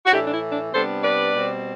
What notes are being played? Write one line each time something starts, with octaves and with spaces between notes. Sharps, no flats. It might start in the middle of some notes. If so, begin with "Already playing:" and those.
F#4
A2 E3 A3 D4 E4 G4
D4
E4
D4
C3 G3 B3 D4 A4 C5
B4 D5
B2 G3 C4